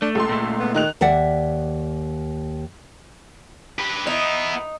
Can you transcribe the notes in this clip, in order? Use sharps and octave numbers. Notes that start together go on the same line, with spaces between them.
A3 D4
C#2 A4 C6
A#2 A3
B3
D#3 D#4 F#6 F7
D#2 D5 E5 F#5
G4 B4
B3 D#4 E4